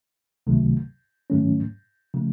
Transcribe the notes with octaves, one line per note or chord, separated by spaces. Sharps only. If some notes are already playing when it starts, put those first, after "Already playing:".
C#2 C3 D#3 F#3 A3
G#2 D#3 F#3 A3 C#4
C#3 F3 A3